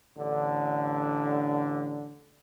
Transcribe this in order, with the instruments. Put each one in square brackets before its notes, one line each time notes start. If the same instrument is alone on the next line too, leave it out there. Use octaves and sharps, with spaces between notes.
[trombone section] A1 D3